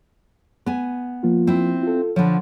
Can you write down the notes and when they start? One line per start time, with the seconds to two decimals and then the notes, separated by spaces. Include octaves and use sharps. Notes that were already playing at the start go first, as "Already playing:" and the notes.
0.66 B3 G#5
1.23 F3 A#3 F4
1.47 C4 E4
1.83 F4 A4
2.16 D3 F3 C#5 F#5 B5